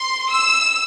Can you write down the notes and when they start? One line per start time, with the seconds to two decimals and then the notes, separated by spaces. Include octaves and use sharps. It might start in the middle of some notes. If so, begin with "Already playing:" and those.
Already playing: C6
0.30 E6